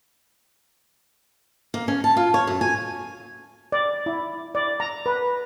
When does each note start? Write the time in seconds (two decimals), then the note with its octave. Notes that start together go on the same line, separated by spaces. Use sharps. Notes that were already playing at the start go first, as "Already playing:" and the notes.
1.74 A#3
1.88 C#4
2.04 A5
2.17 F4
2.34 C#5
2.47 F#2
2.61 G#5
3.72 D5
4.06 E4
4.55 D5
4.80 A#5
5.06 B4